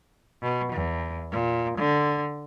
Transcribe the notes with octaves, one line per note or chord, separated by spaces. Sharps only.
B2
E2
A#2
D3